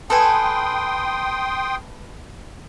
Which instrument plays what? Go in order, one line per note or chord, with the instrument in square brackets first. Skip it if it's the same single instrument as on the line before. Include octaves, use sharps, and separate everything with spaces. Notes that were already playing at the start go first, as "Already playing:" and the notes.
[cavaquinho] A4 B4 G#5 [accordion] G5 C6 D#6